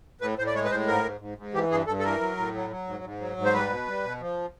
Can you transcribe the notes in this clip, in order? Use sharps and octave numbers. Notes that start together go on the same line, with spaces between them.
A2 B4
A2 C5
D5
G#3 C#5
B4
A2 C5
G#2 A#4
G#2
G#2
G#2
E3 G4
G2 G#4
G2 A4
A4
E3 A#4
F#3
A2
F#3
F#3
G#2
G#2
F#3
G#2
C5
G3 B4
B2
G3
B2
F3